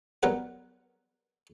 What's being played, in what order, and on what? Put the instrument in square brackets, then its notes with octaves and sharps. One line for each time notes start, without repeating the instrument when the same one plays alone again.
[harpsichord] F#2 F#3 G3 B3 A#4 F#5